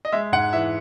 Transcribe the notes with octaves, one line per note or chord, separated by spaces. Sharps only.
D#5
G#3 E5
G#2 F#5
E3 E5